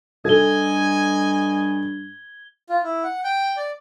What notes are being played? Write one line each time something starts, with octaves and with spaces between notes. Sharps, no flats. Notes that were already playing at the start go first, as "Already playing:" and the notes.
G2 A4 D#5 G#5 G#6 G7
F4
E4
F#5
G5
D5